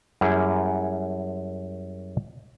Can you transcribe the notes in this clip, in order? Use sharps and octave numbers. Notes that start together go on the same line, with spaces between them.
F#2 G3 A#3 E4 G#4 F#5